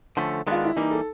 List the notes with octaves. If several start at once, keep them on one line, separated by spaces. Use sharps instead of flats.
D3 F3 A3 C#4
D#3 G#3 B3 D4 F4
E4
E3 G3 A#3 D#4
A4